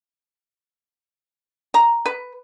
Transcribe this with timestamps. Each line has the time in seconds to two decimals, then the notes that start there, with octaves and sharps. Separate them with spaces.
1.74 A#5
2.06 B4